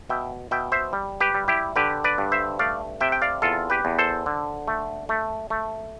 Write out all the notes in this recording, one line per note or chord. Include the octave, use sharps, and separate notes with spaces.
B2 E5 G5
B2 E5 G5
C5 E5
G3
G4 B4
G3
E4 G4
D3 G4 B4
B4 D5
G2
C5 E5
A3 D5 F5
C3 E5 G5
G5
D5 F5
E2 F4 A4
G4 B4
E2
A4 C5
D3
A3
A3
A3